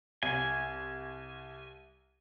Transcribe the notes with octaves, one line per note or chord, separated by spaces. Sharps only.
C2 G#5